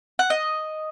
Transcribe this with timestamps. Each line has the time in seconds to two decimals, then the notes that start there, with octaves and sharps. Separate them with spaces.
0.19 F#5
0.30 D#5